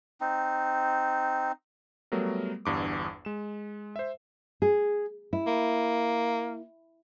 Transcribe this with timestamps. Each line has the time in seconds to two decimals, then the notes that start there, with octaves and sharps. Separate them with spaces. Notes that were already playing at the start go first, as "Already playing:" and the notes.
0.21 C4 D#4
2.12 F#3 G3 A3 B3 A#4
2.65 G1 E2 G2 D6
3.25 G#3 E7
3.96 C5 E5
4.62 G#4
5.33 E4
5.47 A#3